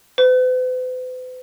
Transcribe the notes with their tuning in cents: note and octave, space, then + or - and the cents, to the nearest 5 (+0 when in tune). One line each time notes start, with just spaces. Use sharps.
B4 +45